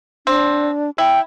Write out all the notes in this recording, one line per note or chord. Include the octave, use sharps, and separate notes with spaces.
C4 D4
E4 G5